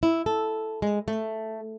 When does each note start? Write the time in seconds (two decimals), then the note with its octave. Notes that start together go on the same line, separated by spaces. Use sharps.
0.03 E4
0.26 A4
0.82 G#3
1.08 A3